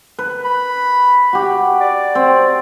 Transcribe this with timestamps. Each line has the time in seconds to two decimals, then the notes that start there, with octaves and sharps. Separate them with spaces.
0.19 B4
0.45 B5
1.33 F#4 G4
1.81 D5
2.15 C4